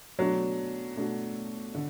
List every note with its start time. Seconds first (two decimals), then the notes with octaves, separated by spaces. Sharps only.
0.18 B2 F#3 A3 D4 F#4
0.96 B2 A3 D4 F#4
1.75 D3